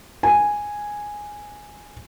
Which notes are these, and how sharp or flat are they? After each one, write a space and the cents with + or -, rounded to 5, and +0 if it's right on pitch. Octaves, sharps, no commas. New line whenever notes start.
G#5 -5